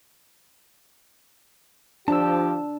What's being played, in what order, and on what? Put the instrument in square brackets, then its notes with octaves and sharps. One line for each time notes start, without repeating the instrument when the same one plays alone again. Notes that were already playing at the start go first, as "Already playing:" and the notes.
[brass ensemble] F3 G4 [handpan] D4 [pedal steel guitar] A5 E6